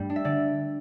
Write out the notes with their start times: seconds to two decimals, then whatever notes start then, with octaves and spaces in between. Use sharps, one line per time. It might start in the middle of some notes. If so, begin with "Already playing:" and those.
Already playing: G2 G3 A3
0.10 D4
0.16 E5
0.24 D3 D5